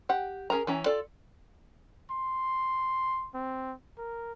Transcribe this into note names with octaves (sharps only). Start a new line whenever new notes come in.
G4 F#5
C#4 G#4 A#4 A#5
E3 C#4 A#5
F4 A4 D5
C6
C4
A#4